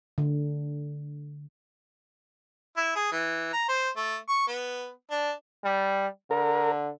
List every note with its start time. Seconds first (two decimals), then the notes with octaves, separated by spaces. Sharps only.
0.18 D3
2.77 E4
2.96 G#4
3.12 E3
3.53 A#5
3.69 C5
3.97 A3
4.29 C#6
4.48 B3
5.10 D4
5.64 G3
6.31 D3 A#4